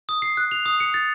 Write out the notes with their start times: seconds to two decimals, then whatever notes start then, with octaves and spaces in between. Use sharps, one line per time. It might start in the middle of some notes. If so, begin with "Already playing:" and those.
0.09 D#6
0.22 C7
0.37 F#6
0.51 F7
0.66 D#6
0.80 C#7
0.94 A6